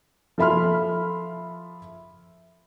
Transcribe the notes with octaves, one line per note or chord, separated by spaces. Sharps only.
F3 A4 E5 B5 C6 F6